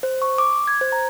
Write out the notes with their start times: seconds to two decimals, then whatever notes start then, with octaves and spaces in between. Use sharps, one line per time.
0.03 C5
0.22 C#6
0.38 D6
0.67 G#6
0.81 C5
0.92 A#5